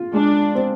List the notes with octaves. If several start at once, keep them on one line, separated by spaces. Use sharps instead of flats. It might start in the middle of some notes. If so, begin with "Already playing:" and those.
Already playing: F4
G#3 D4
C4